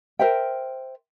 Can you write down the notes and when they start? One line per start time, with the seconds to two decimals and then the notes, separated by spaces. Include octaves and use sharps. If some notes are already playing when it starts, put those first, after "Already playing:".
0.19 A#4 C5 E5 G5